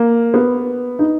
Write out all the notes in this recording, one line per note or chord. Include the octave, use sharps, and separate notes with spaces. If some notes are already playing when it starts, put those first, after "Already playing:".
Already playing: A#3
B3
D#4